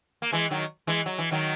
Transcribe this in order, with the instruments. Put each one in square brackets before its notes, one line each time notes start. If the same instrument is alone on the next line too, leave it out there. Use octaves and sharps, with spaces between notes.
[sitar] A#3
E3 G#3
D#3 F#3
E3 G#3
F#3
E3
D#3 F#3